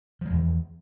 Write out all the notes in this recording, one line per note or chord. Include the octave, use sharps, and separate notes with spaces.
E2 E3 F3 G#3